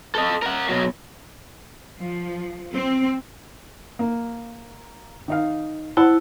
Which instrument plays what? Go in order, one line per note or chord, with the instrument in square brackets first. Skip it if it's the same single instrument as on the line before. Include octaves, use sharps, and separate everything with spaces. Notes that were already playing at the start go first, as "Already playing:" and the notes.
[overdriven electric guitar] A4 D#5
A#4 F#5
B2 F#3
[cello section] F3
C4
[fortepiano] A#3
D#3 D#4 F5
[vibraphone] E4 [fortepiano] C5 F#5 A5